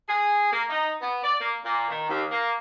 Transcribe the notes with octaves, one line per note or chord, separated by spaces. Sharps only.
G#4
A#3
D#4
B3
D5
A#3
A#2
D#3
D#2
A#3